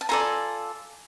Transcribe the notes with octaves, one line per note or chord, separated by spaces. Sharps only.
A5
F4 A4 D5 G#5 A#5